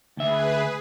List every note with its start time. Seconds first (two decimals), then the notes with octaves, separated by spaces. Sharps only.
0.17 D2 G#4 B4 E5